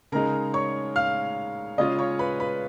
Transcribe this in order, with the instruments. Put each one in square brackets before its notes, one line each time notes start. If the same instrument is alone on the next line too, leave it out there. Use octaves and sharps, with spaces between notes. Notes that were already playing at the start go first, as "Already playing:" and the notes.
[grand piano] C#3 G#3 D#4 A#4 A#5
C#5 C#6
F5 F6
C#3 G#3 C#4 F4 D#5 D#6
C#5 C#6
B4 B5
B4 B5